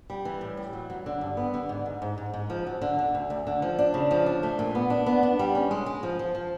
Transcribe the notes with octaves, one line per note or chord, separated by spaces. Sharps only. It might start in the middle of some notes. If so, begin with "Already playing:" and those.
G3
E3
A2
G3
F#3
F#3
D3
G2
B3
D3
G#2
G#2
G#2
G#2
G#2
F3
F#3
D3
D3
D2
D2
D3
F3
D4
C#3
F3
D4
A3
A#2
B3
D4
B3
D4
G3
C#4
G#3
G#3
F3
F3
F3